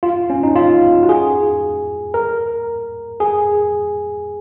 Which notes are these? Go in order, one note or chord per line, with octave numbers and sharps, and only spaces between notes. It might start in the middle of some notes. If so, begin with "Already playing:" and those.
F4
C#4
D#4
F4
F#4
G#4
A#4
G#4